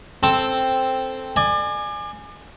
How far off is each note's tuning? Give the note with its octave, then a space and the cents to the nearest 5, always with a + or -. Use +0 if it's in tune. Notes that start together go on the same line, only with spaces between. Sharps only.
C4 +0 A4 +0
D5 +35 G#5 +0